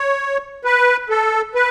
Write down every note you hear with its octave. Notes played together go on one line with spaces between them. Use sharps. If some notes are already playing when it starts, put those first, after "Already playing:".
Already playing: C#5
B4
A4
B4